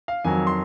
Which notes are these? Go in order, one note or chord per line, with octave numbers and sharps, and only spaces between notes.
F5
F2 D#3 F#3 G#5
C6